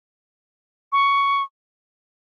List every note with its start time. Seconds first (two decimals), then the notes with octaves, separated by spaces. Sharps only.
0.92 C#6